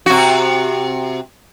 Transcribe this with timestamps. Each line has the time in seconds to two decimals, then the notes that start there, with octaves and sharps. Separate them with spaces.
0.06 C3 F#4